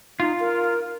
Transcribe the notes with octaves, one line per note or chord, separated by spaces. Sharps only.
D#4 F4
A#4